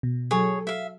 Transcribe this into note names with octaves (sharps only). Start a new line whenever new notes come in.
B2
F#3 G#4 A4 C#5
E5 F5